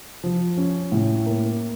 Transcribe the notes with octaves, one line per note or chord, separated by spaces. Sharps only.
F3
C#4
A2
A#3